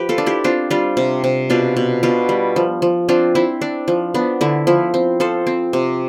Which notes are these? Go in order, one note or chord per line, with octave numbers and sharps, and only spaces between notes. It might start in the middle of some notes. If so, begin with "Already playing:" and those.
Already playing: F3 G4 B4
F4 A4
D4
E4 G4
C4 D4 F4
G3 D4 F4
C3
C3
B2 D4 F4
B2
B2 D4 F4
G3
F3
F3
C4 D4 F4
C4 E4
D4
F3
B3 D4
D3 E4
F3 E4
C4
F3 A4 C5
C4
C3